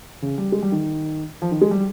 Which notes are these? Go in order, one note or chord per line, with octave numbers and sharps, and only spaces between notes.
C#3
G3
G#3
G3
D#3
F3
D#3
G#3
G3